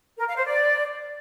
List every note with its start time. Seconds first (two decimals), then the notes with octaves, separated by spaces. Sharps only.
0.18 A#4
0.28 F5
0.37 C5
0.46 D5